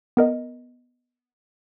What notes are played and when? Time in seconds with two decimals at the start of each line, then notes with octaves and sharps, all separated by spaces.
0.17 B3 A#4 D#5